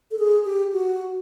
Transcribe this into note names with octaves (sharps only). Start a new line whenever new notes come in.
A4
G#4
G4
F#4